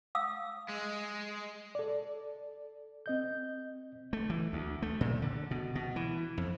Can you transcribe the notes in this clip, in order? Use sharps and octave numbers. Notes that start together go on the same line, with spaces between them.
F5 D#6 E6
G#3
A4 D5
C4 D#5 G6
A3
E3
D2
A3
A#2
D3
B2
B2
E3
F2